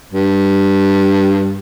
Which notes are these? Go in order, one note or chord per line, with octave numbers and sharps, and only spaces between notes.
G2